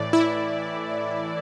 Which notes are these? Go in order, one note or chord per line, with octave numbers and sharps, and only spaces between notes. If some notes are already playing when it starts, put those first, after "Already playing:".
Already playing: A2 E3 D5
E4